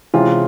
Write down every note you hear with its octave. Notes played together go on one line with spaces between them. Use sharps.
C3 E3 G#3 C#4 F4